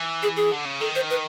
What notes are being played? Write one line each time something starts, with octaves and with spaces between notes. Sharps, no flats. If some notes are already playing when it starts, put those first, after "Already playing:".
Already playing: E3
G#4
G#4
D3
C#3
D#3 A4
C5
B4